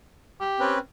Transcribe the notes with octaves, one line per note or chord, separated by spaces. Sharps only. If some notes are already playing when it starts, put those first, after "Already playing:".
G4
C4 C#4 B4